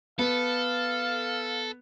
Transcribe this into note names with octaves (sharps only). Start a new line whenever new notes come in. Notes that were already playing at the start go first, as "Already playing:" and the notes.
B3 A4 F5